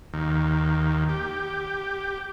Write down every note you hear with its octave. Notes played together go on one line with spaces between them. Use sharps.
D#2
G4